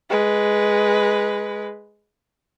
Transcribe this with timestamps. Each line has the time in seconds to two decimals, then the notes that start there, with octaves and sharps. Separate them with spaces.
0.10 G#3 B4